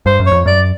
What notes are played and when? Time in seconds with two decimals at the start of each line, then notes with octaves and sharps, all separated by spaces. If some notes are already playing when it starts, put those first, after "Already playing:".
0.06 G2 C5
0.20 F#2
0.26 C#5
0.32 F2
0.45 F#2 D5